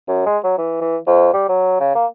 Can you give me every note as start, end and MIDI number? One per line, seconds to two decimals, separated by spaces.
0.08 0.25 42
0.26 0.38 56
0.44 0.55 54
0.58 0.77 52
0.81 0.97 52
1.07 1.29 41
1.33 1.46 55
1.49 1.80 54
1.80 1.93 49
1.95 2.06 58